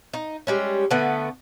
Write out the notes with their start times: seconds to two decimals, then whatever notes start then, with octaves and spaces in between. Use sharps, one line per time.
0.14 D#4
0.47 G3 G#3 C#4
0.91 D3 A3 B3